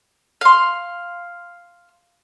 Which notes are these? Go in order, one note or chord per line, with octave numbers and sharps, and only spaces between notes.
F5 C6